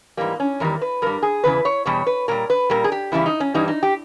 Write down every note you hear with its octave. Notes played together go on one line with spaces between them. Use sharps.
G#2 E3 G3 A#3
C#4
E2 D#3 G3 A#4
B4
G2 G3 A#4
G#4
E2 C#3 E3 B4
C#5
E2 B2 G3 C#5
B4
A#2 G3 A#4
B4
A#2 G3 A#4
G#4
G4
E2 C#3 E3 G3 E4
D#4
C#4
G2 E3 G3 D#4
D#4
G4